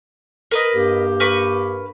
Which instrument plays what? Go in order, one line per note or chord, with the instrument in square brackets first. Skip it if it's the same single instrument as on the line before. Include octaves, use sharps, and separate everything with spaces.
[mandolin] A#4 B4 D#5
[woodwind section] G2 A#3 G4
[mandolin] A#4 B4 C#6